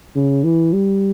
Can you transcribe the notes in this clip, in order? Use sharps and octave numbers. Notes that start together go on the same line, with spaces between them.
C#3
E3
G3